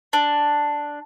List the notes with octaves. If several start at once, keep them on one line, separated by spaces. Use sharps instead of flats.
D4